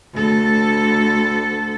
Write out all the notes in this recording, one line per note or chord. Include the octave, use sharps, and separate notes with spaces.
D2 A4